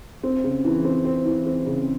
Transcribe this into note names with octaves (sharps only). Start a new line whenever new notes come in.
C4
C#3
E3
C4
C4
E3
C4
C#3